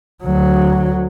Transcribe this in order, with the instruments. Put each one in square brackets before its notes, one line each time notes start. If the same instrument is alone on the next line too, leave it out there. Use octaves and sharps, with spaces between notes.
[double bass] D2 F#3